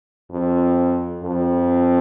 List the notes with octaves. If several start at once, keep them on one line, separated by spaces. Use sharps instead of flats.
F2
F2